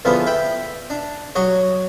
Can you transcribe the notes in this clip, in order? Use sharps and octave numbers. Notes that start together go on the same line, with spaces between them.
E2 D3 F3 B3 B4
E5 G5 B5
D4
F#3 F#4 C#5 D#5